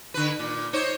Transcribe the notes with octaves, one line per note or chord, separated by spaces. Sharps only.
D3 B4
A#2
D#4 C5 C#5